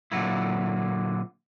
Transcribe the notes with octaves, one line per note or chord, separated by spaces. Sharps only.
A#2 D3 F3 F#3 A#3 E4